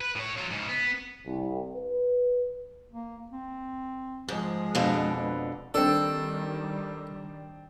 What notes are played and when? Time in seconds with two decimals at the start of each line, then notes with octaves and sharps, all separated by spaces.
0.01 B4
0.16 A2 C#5
0.38 F#3 F4
0.51 G#2 C#3
0.69 B3
1.26 C2
1.76 B4
2.91 A#3
3.32 C4
4.28 G#2 F3 G#3
4.75 F2 B2 D3 D4
5.23 B4
5.74 D#3 G3 C4 D4 A4